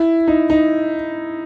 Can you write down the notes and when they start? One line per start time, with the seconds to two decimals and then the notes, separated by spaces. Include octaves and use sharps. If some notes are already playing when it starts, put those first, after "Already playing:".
Already playing: E4
0.28 D#4
0.50 D#4